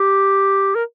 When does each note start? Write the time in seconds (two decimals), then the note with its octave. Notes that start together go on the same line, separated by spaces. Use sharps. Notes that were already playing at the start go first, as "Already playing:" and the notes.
Already playing: G4
0.75 A#4